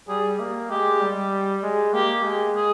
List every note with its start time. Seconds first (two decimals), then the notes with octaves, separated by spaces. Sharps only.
0.08 G3 G#4
0.40 A#3
0.70 G#3 G4
1.01 G3
1.63 G#3
1.93 A#3 G4
2.24 G#3
2.56 G#4